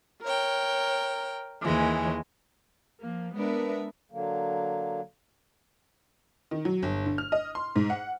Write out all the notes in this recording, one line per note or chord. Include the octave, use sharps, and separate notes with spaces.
A#4 C#5 G5
D#2 E3 G#3
F3 A#3
G#3 B3 D4 A#4 B4 E5
D3 F#3 A#3
D#3
F#3
G1
D3
F6
D#5
C6
G#2
F#5